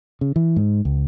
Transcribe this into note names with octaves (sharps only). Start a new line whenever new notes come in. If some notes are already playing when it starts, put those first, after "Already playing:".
C#3
E3
G#2
C#2